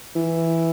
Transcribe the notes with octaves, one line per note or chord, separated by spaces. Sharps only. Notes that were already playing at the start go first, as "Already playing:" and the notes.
E3